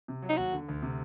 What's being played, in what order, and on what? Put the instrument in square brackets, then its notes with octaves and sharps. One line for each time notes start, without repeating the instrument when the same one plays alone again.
[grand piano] C3
F#3
[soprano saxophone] D#4
[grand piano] D#2 [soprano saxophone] F#4
[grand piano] D3
D2
C3